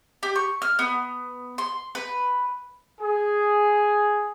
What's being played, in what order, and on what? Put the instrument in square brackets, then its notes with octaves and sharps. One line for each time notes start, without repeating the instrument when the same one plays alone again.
[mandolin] G4
C#6
F6
B3
C6
B4
[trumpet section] G#4